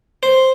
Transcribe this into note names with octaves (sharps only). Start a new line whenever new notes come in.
C5